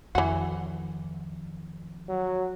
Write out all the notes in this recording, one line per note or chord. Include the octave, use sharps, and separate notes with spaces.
F2 D#3 E3 F#4
F#3